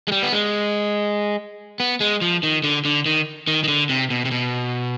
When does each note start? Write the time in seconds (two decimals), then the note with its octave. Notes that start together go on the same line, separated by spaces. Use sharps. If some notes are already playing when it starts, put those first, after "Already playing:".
0.08 G#3
0.12 G3
0.23 B3
0.33 G#3
1.80 B3
2.00 G#3
2.21 F3
2.43 D#3
2.64 D3
2.85 D3
3.06 D#3
3.47 D#3
3.64 D#3
3.68 D3
3.89 C3
4.10 B2
4.25 C3
4.31 B2